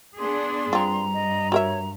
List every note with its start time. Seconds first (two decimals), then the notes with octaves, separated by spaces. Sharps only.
0.19 B3 D4 G#4 C6
0.73 G2 C4 F4 A#5
1.14 D#5
1.52 F#4 A#4 C#5 E5